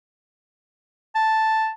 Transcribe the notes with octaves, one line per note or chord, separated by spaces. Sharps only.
A5